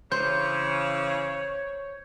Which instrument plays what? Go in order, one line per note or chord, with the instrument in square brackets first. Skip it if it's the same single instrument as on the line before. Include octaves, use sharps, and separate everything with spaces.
[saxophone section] C#3 E3 [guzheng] C5 [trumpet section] C#5 [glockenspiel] G6